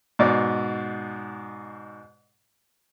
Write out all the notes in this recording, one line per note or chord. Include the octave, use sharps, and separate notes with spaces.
G#2 B2 D5